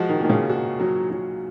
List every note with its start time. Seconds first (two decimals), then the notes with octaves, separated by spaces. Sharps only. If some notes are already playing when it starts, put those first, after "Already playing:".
Already playing: F3 G#3 F#4
0.09 D#3
0.20 A#2 D#3
0.29 C#3
0.50 F#4
0.80 F#3
1.10 F#3